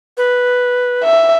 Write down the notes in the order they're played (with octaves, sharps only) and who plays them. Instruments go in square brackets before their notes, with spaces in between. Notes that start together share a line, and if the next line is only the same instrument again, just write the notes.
[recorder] B4
[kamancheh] E5